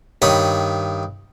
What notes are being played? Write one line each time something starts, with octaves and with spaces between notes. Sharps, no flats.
G2 D#3 C#5 B5 D#6